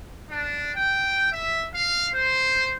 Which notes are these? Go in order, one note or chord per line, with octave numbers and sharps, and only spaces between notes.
D4
G5
E5
F5
C5